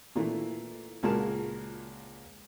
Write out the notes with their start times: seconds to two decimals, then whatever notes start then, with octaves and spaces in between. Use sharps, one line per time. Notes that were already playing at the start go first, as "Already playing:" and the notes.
0.16 A#2 E3 A3
1.03 C#2 A#2 F#4 G#4 A#4 A5